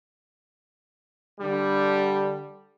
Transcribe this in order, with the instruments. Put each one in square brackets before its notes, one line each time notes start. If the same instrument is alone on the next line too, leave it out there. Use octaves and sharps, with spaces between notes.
[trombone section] D3 G3